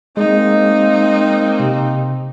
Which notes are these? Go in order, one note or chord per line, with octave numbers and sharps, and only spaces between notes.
G#3 A#3 C4 D#4
C3